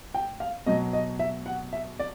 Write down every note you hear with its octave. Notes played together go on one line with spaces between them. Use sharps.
G5
F5
B2 F#3 D#5
D#5
E5
F#5
E5
D5